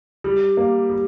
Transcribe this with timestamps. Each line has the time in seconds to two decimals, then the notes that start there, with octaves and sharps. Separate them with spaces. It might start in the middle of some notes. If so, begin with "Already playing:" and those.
0.24 G3
0.57 A#3
0.90 G3